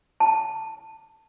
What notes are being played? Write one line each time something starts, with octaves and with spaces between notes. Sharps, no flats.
A5